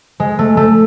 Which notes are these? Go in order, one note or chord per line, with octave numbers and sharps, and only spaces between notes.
G#3
A3
A3